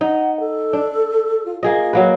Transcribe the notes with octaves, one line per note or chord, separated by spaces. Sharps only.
D#4 F#5
A4
D4
F4
A#3 F4 G#4 D#5
F#3 A#3 B4